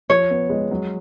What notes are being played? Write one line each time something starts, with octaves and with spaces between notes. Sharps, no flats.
F3 C#5
B3
G#3
F#3